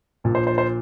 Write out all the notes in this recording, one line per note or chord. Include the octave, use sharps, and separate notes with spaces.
A#1 A#2 F3
C5
C5
C5